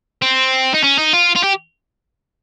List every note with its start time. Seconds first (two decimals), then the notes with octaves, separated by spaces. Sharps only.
0.22 C4
0.74 D#4
0.83 C#4
0.98 D#4
1.13 F4
1.36 F4
1.44 G4